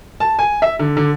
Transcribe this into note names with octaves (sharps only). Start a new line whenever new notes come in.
A5
G#5
E5
D3
D3